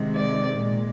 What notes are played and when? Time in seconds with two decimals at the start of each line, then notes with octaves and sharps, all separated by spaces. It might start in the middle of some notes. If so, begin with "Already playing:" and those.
Already playing: C3 D#3 G#3
0.15 D5
0.59 A#2 G#3